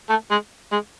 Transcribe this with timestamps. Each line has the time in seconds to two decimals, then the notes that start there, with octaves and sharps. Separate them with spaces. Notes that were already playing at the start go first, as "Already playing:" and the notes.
0.09 A3
0.30 G#3
0.72 G#3